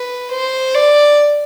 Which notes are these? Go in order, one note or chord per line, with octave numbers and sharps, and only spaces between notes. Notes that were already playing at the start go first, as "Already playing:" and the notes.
Already playing: B4
C5
D5